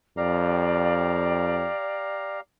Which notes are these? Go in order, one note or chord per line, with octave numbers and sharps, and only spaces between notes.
F2 G4 D5 F5 A#5